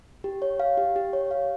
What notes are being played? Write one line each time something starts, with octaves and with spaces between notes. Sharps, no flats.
G4
C#5
F5
G4
G4
C#5
F5